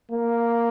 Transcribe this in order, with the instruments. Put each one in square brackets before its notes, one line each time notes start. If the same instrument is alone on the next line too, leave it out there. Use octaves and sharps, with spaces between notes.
[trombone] A#3